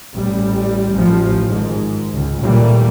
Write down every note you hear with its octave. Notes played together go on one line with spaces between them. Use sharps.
A1 G3
A1 F3
G#1 G#2
C#2
D#2 A#2 E3 G3 A3